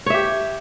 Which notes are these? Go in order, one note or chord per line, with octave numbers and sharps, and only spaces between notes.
G4 C#5 E5